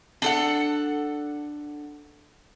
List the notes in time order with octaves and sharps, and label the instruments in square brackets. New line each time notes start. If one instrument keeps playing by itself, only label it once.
[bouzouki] D4 A4 F#5